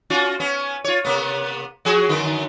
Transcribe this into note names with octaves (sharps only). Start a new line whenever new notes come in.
C#4 F4 F#4
B3 C#4
F4 C#5
C3 A#3 B3
F3 F#4 G#4
F#2 D3 B3